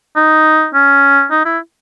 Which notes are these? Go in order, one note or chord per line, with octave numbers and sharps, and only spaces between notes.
D#4
C#4
D#4
E4